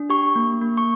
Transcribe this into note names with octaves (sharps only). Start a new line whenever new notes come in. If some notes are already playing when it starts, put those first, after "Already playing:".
Already playing: D4
G4 C#6
A#3
A#3
C#6